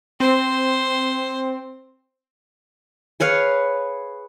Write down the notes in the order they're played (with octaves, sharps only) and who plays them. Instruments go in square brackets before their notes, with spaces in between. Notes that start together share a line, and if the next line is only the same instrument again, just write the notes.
[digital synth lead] C4 [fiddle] C5
[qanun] G#4 B4 C#5 F5